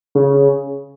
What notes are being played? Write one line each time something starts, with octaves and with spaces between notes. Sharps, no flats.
C#3